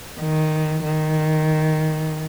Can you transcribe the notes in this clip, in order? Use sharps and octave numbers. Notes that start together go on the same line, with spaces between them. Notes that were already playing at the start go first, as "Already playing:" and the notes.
D#3
D#3